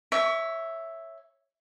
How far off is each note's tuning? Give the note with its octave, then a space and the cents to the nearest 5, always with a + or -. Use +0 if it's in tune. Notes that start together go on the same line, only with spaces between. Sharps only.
C#5 -10 E5 +0 C#6 +35